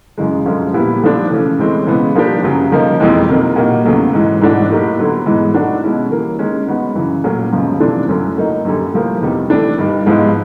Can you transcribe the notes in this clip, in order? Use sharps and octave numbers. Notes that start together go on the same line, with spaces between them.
F#2 C#3 E3 G#3
F#2 D3 F3 G#3 C#4
A#2 G3 B3 E4 G4
D3 F3 A3 D4
C#3 E3 A3 C#4
A2 E3 G#3 C4
C#3 E3 G#3 B3
F3 A#3 D4 G4
F#2 C#3 F#3
C#3 F3 A#3 D#4
F2 C3 E3 G#3 C4
C3 D#3 F#3 A#3
A#2 G3 A#3 D#4 F#4
E2 C#3 F#3 A3
G#2 E3 G#3
G#2 E3 A3 D4 F#4
A2 F#3 A#3 D#4 G4
D3 F#3 B3
G#2 E3 G#3 B3
D#3 F#3 A3 D4 F#4
B2 G#3 C#4 E4
E3 G3 A#3
D#3 G#3 C#4
D#3 G#3 B3 D#4 F#4
F#2 C#3 E3
A#2 F#3 A3 C#4
F#2 C#3 F3 G#3 B3
C3 E3 A3 D4 F4
F#2 D3 F#3 A3 C#4
A2 F#3 A#3 D#4
F#2 D3 G3
A2 F3 A#3
E2 C3 D#3 G3
E3 A3 D4
G2 D#3 G3
G#2 F3 G#3 B3 E4